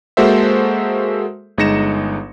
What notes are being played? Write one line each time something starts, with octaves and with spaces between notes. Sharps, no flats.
G#3 A#3 F#4 A4 C5 E5
G1 G#3 D#4 A#6 C#7 E7